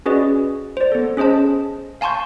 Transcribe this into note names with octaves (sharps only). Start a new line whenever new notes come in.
C#4 F#4 G#4 B4 D5 D#5
C5 D5
B3 A4
C#4 G#4 C5 D#5 A5
F5 G#5 A5 C6 C#6 G6